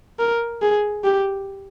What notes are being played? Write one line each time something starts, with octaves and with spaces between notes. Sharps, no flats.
A#4
G#4
G4